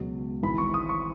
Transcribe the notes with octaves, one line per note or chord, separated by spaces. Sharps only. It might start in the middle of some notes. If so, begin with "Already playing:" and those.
Already playing: C#2 B2 F#3
G#1 G#2 E3 B5
C#6
D#6
C#6